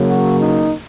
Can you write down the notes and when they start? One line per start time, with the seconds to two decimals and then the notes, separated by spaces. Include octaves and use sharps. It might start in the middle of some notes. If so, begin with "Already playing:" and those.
Already playing: C#3 F#3 A#3
0.09 F#4
0.39 D#4